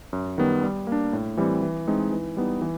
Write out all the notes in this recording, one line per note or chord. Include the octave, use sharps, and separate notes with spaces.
F#2
D#3 G3 B3
G3
A#3 D4
A2
E3 G3 C4
E3
G#3 C4 D#4
E3
G3 B3 D#4
E3